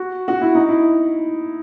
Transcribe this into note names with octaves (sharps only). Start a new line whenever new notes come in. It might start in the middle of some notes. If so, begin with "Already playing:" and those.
Already playing: F#4
F#4
E4
D#4
E4